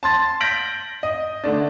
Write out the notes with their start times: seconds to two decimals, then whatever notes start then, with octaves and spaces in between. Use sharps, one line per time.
0.03 A5 C6 A6
0.41 G6 A#6 B6 D7 F#7
1.03 D#5
1.44 D3 A3 D4